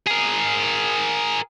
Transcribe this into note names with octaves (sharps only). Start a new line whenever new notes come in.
G#4 A#4